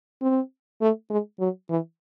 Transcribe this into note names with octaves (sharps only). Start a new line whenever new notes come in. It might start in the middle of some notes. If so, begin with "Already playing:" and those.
C4
A3
G#3
F#3
E3